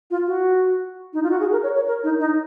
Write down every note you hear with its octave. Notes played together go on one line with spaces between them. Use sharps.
F4
F#4
D#4
F4
F#4
G#4
A#4
C#5
C#5
A#4
D#4
D#4